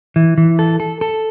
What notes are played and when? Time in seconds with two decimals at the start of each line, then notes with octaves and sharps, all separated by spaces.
0.16 E3
0.38 E3
0.59 A4
0.80 A4
1.01 A4